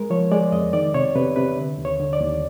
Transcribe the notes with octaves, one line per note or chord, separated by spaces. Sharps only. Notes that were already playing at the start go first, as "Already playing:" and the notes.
Already playing: G#3 A#4
F3 C#5
G#3 D5
F2 D#5
D#3 D5
C3 C#5
C3 B4
C3 B4
D3
D#2
C#5
D3
D5
D#2